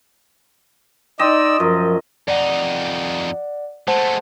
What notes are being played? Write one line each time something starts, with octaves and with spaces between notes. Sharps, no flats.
D#4 D5 D#5 G5 C6 E6
F#2 F3
F2 D#4 D5 F#5
G#3 A3 C5 F#5 A5